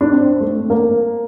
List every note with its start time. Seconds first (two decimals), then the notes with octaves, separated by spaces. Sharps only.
0.01 D4
0.12 C4
0.40 A3
0.70 A#3